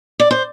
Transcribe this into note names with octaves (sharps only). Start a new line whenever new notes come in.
D5
C5